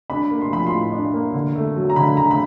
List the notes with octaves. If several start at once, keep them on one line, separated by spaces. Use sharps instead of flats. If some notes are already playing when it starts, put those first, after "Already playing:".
D4 B5
A#3
C6
F3 B5
C6
A2
D4
A#3
D3
A3
F#3
A#5
D3 B5
D3 A#5
B5